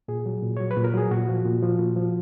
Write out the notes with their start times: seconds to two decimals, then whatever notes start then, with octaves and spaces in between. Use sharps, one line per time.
0.08 A#2 G#4
0.26 F#3
0.43 A#2
0.57 F#3 C#5
0.71 B4
0.77 A#2
0.84 A#4
0.94 F#3 G#4
1.11 A#2 F#4
1.29 F3
1.45 A#2
1.62 F3
1.79 A#2
1.96 F3